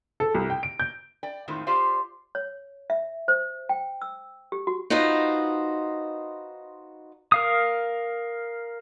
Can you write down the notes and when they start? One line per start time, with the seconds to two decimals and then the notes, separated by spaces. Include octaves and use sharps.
0.20 A4
0.35 C2
0.50 G5
0.63 D7
0.80 G6
1.23 D5 G5
1.48 F2 A2 D#3 F3 G#3
1.67 F4 G4 C5 D5 F5
2.35 C#5
2.90 E5
3.28 C5
3.69 G5
4.02 E6
4.52 G4
4.67 F#4
4.90 D#4 F4 F#4 B4 C5 D#5
7.32 A#4 F5 D#6